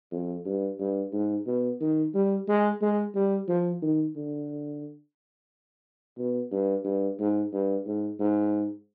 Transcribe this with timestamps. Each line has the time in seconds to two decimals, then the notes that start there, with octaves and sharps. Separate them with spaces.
0.12 F2
0.46 G2
0.79 G2
1.13 G#2
1.46 B2
1.80 D#3
2.14 G3
2.48 G#3
2.81 G#3
3.15 G3
3.48 F3
3.82 D#3
4.16 D3
6.18 B2
6.52 G2
6.85 G2
7.19 G#2
7.53 G2
7.86 G#2
8.20 G#2